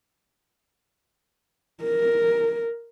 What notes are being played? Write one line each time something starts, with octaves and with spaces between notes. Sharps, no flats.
A#4